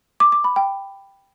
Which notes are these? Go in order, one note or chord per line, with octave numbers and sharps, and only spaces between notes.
D6
D6
B5
G5